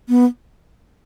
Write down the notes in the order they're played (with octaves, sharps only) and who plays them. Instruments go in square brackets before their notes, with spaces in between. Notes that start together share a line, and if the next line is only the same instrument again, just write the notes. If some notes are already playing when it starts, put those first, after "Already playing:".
[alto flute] B3